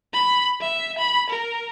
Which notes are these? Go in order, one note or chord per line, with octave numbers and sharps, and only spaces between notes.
B5
E5
B5
A#4